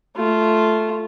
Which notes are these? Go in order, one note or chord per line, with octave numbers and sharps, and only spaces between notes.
A3 F4